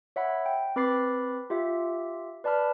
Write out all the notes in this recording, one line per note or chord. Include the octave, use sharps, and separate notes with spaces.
C#5 E5 F#5 B5
G5
C4 B4 B5 D6 A6 C7
F4 G4 E5
B4 D5 A5 B5 F6